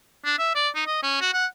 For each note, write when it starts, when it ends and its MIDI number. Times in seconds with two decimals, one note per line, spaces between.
0.25 0.34 62
0.39 0.55 76
0.55 0.69 74
0.75 0.84 63
0.87 1.02 75
1.03 1.18 61
1.21 1.33 66
1.34 1.46 78